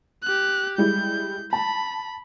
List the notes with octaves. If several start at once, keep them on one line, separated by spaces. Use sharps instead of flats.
G4 F#6
G3 G#3 E4 G6
A5 B5